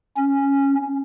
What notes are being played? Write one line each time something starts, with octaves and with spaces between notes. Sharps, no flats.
C#4